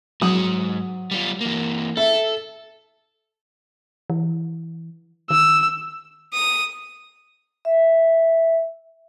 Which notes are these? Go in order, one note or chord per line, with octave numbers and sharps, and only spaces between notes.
G#2 F#3 F#5 D#6
G3 F4
E3 A#3
A4 E5
E3
D#3 E6
D#6
E5